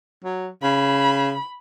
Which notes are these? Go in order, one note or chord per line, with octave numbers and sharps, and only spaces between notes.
F#3
C#3 B5